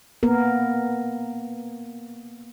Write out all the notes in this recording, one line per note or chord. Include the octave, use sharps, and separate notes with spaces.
A#3 B3 A#4